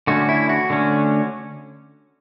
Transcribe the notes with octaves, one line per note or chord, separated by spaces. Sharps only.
D3 A3 C#4 F#4
E4
F#4
D3 A3 C#4